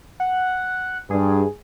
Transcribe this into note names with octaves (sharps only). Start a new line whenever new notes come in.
F#5
G2 G#4